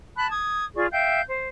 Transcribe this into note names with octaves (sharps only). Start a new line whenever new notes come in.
A5 B5 F#6
D#6 G#6
F4 G#4 D5 C#6
E5 F5 G5 G6
C5